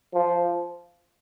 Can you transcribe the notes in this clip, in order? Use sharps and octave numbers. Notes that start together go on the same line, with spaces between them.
F3